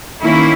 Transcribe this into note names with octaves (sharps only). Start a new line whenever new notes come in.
D#3 A#3 C#4 E4